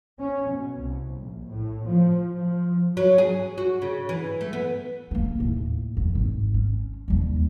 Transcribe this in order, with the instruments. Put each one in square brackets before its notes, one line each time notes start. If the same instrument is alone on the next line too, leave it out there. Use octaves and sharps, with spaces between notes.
[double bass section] C#4
B2
C2
A#1
A2
F3
F3
[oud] F#3
G#4
F#4
C#3
E3
A3
B3
[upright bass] A#3 B3
D#2 A2
F2
G#1
C#4
D#2 G3